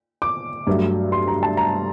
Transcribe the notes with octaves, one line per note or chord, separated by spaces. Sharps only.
D6
G2 F#3 A3
C6
A#5
A5
A#5